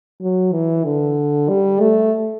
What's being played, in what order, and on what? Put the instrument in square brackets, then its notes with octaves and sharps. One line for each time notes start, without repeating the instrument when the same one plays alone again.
[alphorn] F#3
E3
D3
G3
A3